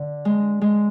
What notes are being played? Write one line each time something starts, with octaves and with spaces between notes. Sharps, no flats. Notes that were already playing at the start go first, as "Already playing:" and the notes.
Already playing: D3
G#3
G#3